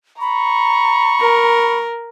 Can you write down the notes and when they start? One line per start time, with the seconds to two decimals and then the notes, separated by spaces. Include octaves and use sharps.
0.21 A#5 B5 C#6
1.20 A#4